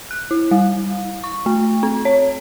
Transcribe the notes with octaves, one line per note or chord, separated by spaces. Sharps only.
F#6
E4
G3
C#6
A3
C4
C#5